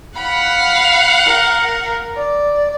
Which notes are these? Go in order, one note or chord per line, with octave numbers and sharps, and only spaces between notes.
F5 F#5 B5
A#4
D5